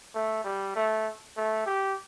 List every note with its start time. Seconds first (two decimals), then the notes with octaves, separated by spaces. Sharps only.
0.14 A3
0.44 G3
0.75 A3
1.37 A3
1.66 G4